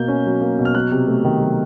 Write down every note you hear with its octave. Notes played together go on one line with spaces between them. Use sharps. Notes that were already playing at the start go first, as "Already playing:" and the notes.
Already playing: B2 A#3 G6
C#4
F#3
A#3
B2
F6
F#3 F#6
C3
A3
D#3
F#3